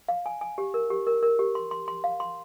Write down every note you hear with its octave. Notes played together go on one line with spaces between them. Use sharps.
F5
G#5
G#5
G4
A#4
G4
A#4
A#4
G4
C6
C6
C6
F5
C6